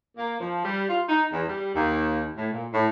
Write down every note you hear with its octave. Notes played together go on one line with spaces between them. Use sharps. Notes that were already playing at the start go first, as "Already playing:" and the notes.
A#3
F3
G3
F4
D#4
E2
G3
D#2
A2
A#2
A2